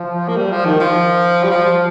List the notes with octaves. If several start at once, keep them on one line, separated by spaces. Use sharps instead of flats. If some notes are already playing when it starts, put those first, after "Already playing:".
Already playing: F3
A#3
G3
F3
D#3
F3
G3
F3